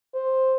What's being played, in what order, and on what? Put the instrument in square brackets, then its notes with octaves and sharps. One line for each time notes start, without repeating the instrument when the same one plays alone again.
[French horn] C5